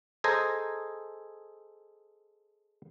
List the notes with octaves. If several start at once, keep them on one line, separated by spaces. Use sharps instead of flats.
G#4 A4 C5 D#5 G#5 A#5